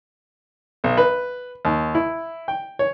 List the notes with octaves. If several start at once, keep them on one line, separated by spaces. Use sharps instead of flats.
B1
B4
D#2
E4
G5
C#5